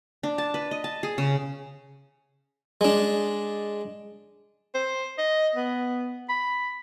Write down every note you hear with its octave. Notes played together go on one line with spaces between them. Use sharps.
D4
A5
B4
D#5
A5
G#4
C#3
G#3 D4
C5
D#5
B3
B5